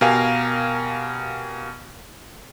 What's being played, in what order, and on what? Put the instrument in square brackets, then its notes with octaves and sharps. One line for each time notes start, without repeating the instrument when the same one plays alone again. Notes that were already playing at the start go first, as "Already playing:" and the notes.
[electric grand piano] B2 G4 A#4 F5 G#5